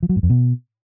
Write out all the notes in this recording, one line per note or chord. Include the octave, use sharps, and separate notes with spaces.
F3
F#3
G#2
F2
B2